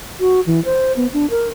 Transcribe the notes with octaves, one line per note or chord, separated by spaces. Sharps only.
F#4
E3
C5
B3
D4
A#4